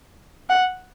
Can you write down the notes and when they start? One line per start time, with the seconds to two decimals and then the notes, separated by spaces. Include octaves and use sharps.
0.50 F#5